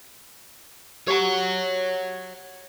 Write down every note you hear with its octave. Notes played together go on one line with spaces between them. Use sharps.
G4 C#5 F#5 A#5